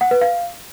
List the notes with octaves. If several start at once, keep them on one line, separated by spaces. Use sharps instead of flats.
F#5
B4
F5